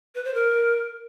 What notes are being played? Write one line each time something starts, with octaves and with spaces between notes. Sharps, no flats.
B4
C5
A#4